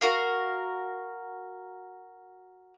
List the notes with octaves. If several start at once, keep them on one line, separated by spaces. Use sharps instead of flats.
F#4 A#4 F5